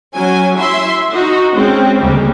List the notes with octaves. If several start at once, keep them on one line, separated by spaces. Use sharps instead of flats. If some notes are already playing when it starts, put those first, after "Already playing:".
F#3 C#4 G#5
E4 E5 C6
D#4 F#4
G#3 C4 C#4
D2 C#3 G3 G#3 A#3